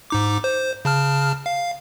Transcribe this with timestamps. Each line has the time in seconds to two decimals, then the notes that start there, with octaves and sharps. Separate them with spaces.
0.10 G#2 D#4 D6
0.44 C5
0.85 C#3 A5 F6
1.46 F5